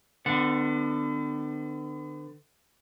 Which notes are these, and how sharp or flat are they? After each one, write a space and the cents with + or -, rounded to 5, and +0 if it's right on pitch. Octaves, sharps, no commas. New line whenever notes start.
D3 +30 B3 +45 F#5 -15